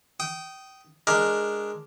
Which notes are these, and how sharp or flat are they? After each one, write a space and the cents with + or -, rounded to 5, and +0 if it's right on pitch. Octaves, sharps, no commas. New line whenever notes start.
G5 -25 D#6 +0
G#3 +0 D4 +0 A#4 +0